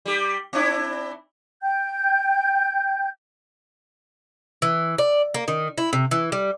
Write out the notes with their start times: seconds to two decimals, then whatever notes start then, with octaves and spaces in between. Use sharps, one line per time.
0.06 G3 G4
0.53 C4 D4 E4
1.62 G5 G6
4.62 E3
4.98 D5
5.34 A#3
5.48 D#3
5.78 E4
5.93 C3
6.11 E3
6.32 G3